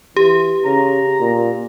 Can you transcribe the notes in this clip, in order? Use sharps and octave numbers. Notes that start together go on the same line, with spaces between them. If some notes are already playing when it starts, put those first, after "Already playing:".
E3 G4
C#3 A#5
A#2